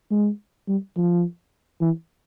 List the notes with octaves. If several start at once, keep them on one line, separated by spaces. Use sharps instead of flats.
G#3
G3
F3
E3